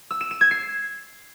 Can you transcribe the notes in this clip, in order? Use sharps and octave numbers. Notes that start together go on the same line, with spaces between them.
E6
E7
E7
G#6
C7